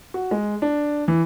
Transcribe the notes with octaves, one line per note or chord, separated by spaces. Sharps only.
F#4
G#3
D4
E3